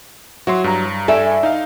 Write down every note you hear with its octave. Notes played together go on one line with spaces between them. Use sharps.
F#3 F#4 E5 C6
G2 A#5
G2 A4 D5 E5 G#5
D#4 F5